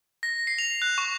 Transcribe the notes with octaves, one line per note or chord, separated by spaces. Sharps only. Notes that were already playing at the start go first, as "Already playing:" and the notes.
A#6
C7
F7
F#6
C#6